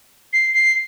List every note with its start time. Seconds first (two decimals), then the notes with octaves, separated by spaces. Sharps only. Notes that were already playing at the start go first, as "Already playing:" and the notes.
0.33 C7
0.54 C7